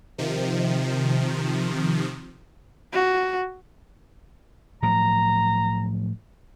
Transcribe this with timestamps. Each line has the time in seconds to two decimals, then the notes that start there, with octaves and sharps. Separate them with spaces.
0.18 C3 D#3 F3
2.93 F#4
4.83 A2 F3 F#3 A#5